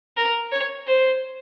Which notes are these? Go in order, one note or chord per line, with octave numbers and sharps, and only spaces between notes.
A#4
C#5
C5